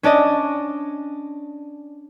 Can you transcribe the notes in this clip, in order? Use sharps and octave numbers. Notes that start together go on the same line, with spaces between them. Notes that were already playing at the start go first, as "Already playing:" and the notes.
C#4 D4 D5 D#5